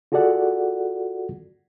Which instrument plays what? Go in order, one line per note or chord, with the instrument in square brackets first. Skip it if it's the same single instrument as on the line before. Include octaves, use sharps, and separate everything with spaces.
[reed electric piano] F4 F#4 G#4 A4 D5 F#5